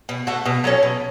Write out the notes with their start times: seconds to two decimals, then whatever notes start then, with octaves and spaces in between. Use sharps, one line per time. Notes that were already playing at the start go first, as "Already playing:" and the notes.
0.09 B2
0.27 A3 F#4
0.45 B2
0.64 F#3 A3 C#4
0.83 B2